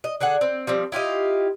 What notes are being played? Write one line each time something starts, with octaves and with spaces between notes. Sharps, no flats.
D#5
D3 G#4 A4 F#5
C4
F3 G3 C4
E4 F4 G4 D#5